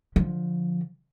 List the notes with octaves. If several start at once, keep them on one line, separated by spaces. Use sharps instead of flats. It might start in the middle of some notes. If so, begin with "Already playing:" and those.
D3 F3